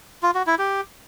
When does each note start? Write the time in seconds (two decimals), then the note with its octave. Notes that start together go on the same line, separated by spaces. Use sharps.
0.23 F4
0.35 F#4
0.47 E4
0.59 G4